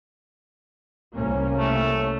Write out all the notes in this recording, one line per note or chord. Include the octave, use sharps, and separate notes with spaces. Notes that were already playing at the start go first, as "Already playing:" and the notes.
C2 A#3 C#4
A3